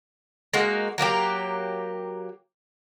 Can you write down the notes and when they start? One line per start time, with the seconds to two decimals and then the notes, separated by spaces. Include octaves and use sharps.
0.54 G#3 A#3 D#4 F#4
0.98 F#3 A#3 D#4 G4